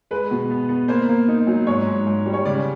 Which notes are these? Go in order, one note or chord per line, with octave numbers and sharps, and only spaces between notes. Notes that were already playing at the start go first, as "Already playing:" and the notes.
G#3 B4
B2
B3
B3
A#3 C5
A#3
D#4
F#3
G#2 C#5
G#2
G#2
G3
C#5
C#3 D5